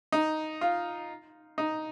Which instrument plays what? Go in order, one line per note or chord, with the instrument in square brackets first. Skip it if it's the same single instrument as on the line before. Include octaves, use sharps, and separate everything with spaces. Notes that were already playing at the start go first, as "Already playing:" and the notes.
[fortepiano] D#4
F4
D#4